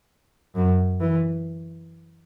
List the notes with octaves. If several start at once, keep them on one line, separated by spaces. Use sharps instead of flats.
F#2
E3